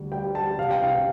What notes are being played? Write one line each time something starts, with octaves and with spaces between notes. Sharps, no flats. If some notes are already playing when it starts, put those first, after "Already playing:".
Already playing: D2 G3
G3 G5
G3 A5
C3 F5
G5
C2 F5